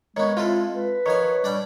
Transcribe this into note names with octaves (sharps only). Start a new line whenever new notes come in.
D#3 G#3 B3 C#5
C4 E4 F4 A4
B4
D#3 F3 C#5 G#5
G3 D4 D5 G5